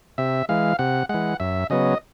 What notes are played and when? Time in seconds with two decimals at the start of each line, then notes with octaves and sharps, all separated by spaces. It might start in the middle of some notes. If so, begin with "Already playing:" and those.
0.18 C3 E5
0.49 E3 G#3 F5
0.79 C3 F#5
1.09 E3 G#3 F#5
1.40 F#2 E5
1.70 C#3 F#3 B3 D#5